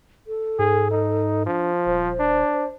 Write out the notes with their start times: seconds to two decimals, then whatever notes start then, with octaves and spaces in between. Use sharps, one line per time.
0.27 A4
0.59 G#2 G#4
0.91 D#4
1.46 F3 D4
1.87 D#1 C5
2.19 D4